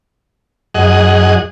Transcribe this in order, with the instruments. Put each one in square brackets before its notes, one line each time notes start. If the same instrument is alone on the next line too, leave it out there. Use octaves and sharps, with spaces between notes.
[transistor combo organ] F#2 G#4 D#5 F#5